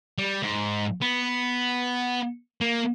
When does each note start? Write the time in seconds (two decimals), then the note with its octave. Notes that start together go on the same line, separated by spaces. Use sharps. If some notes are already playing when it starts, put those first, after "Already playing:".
0.18 G3
0.43 G#2
1.02 B3
2.61 A#3